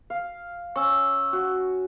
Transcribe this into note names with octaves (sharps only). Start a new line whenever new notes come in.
F5
C#4 C#6 E6
F#4